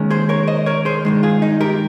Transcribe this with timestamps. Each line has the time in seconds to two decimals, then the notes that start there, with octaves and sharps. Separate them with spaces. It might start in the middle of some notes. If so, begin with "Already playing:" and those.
Already playing: D#2 D#3 G#3 C#4
0.10 G#4 C5
0.29 A#4 C#5
0.47 C5 D#5
0.66 A#4 C#5
0.85 G#4 C5
1.05 G2 D#3 G#3
1.23 F4 G#4
1.42 D#4
1.61 G4 A#4